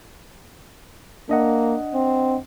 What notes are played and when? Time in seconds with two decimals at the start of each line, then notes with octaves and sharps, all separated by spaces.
1.29 A#3 D4 D#5 F#5
1.94 C4